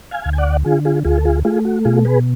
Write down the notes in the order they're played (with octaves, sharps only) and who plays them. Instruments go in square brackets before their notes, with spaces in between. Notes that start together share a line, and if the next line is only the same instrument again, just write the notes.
[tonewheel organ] F5 G#5
D2
G#5
D5 F#5
D3 F4 G#4
F4 G#4
D2 F4 G#4
A4
F4 G#4
A3 F4 G#4
F#4
B2 F4 G#4
G#4 B4